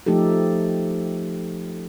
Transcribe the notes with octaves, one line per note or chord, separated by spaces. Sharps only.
F3 A3 D#4 G4 A4